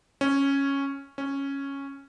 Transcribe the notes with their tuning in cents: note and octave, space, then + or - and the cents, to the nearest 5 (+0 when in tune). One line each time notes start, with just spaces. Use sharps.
C#4 -5
C#4 -5